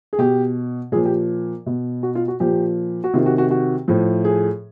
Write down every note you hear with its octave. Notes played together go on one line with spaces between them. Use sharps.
G#4
B2 G4
A#2 F3 G#4
G4
B2
F#4
F4
F#4
A#2 F3 G4
F#4
C3 D#3 F4
F#4
F#4
F#4
A2 F3
G#4